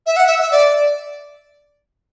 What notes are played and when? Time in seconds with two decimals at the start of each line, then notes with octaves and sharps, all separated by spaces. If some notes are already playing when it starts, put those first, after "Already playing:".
0.06 E5
0.16 F#5
0.27 E5
0.41 E5
0.51 D5